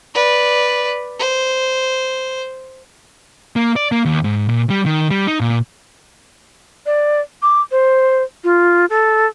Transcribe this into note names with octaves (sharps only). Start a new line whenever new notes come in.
B4 D5
C5
A#3
D5
A#3
D#2
G#2
A#2
G3
D#3
G3
D#4
A#2
D5
D6
C5
F4
A4